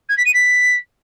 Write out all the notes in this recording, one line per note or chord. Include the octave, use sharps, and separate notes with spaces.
G#6
B6
D#7
B6